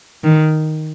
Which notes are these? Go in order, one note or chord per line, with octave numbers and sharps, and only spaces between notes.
D#3